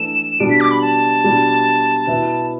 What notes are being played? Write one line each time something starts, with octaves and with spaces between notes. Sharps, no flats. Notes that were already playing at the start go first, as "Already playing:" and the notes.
Already playing: E3 A3 D4 A4 E7
B2 G3 D4 D7
B6
D6
B5
A5
B2 G3 D4
B2 B3 E4 B4 E5